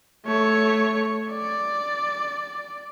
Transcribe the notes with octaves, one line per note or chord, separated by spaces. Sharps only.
A3 C#5
D5